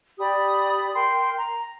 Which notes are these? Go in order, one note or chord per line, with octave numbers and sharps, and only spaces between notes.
G4 D5 B5 D#6
A#4 G5 C6
A#5